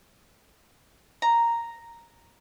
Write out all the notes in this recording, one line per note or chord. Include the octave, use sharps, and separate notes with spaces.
A#5